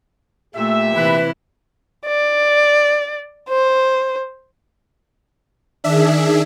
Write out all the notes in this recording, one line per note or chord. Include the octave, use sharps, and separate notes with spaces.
A#2 A3 G4 E5
C3 E3 E4 B4
D5
C5
D#3 D4 G#4 E5